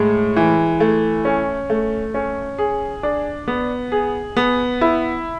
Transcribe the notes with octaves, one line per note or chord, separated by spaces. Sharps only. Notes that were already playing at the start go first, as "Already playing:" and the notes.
Already playing: A2 G#3
E3
A3
C#4
A3
C#4
G#4
D4
B3
G#4
B3
E4